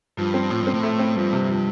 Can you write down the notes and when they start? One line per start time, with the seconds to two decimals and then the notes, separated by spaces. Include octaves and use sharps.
0.17 G2 F3
0.34 C4
0.50 A2 F3
0.62 G2 C4
0.74 A2
0.83 A3
0.99 C4
1.15 G2 F3
1.33 C3
1.48 F3